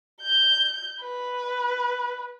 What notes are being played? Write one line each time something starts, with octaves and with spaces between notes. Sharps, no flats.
G6
B4